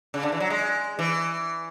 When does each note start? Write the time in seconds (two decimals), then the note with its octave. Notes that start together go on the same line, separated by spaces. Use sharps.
0.14 C#3
0.23 D3
0.32 E3
0.40 F#3
0.50 G#3
0.99 E3